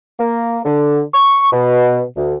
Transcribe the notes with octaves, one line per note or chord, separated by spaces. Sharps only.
A#3
D3
C#6
B2
D2